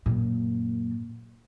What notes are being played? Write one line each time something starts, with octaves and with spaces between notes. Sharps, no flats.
F#2 A#2